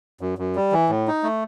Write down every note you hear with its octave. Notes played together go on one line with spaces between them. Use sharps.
F#2
F#2
G3
E3
A2
D#4
A3